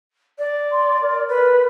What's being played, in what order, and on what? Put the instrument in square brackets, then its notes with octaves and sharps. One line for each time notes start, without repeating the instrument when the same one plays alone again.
[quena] D5
[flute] C6
A#4
[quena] B4